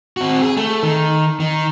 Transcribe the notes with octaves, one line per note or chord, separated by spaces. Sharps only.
C4 F#4
G#4
A3
D#3
D#3